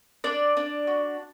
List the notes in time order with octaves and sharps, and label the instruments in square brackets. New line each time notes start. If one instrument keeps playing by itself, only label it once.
[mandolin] D4 D5
D4
F#4